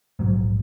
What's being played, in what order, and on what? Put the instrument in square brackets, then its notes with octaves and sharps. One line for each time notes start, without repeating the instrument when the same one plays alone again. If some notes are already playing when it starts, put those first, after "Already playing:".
[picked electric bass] A#1 G#2 F#3